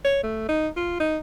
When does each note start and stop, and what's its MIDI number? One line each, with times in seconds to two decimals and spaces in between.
0.04 0.21 73
0.23 0.47 57
0.49 0.67 63
0.76 0.98 65
1.00 1.17 63